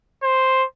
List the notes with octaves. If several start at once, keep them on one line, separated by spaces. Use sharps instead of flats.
C5